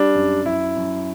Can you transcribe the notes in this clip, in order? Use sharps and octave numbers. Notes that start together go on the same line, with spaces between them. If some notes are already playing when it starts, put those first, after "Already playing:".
Already playing: G3 D4
F#2
F#2 E4
F#2